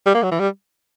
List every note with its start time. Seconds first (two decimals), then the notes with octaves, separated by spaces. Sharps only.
0.06 G3
0.14 A#3
0.23 F#3
0.31 E3
0.39 G3